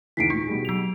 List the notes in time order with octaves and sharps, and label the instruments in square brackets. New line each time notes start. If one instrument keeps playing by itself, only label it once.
[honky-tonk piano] D#2 C#3 E3 [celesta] B6 C7 D7
[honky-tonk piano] A#2 C#6 [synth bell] D#4
[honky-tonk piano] B2 G3 G#4
[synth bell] F#3 F7